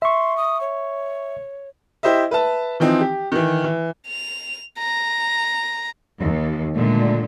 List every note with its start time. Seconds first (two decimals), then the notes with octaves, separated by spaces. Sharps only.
0.02 E5 C6 C#6
0.37 D#6
0.61 C#5
2.03 E4 G4 C5 D#5 E5
2.31 B4 E5 A5
2.80 E3 F3 C4 D#4
3.01 G4
3.32 D#3 E3
3.64 E3
4.07 F7
4.78 A#5
6.20 D#2
6.75 A#2 D3 G#3 A3